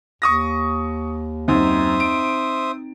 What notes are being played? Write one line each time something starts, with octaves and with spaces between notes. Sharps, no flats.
D#2 C#6 D#6 A#6
F#2 C4 D#4 C5 E5 D#6
D7